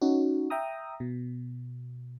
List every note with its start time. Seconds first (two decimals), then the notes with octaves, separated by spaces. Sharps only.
0.01 C#4 D#4 F#4
0.50 E5 G5 A#5 D#6
1.00 B2